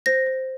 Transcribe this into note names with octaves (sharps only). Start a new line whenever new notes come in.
C5 A#6
C5